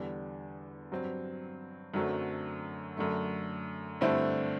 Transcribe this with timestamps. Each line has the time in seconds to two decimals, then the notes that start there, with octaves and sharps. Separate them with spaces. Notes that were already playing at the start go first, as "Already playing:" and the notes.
Already playing: E2 D3 G3
0.91 G2 F#3 C4
1.94 F#2 D3 F#3 A3 C4
2.97 F#2 D3 A3
4.01 G2 D3 A3 C4 E4